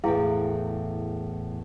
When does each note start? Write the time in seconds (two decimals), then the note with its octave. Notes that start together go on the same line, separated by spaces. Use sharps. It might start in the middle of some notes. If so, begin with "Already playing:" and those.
0.04 E2 A2 E4 G#4 F5 G5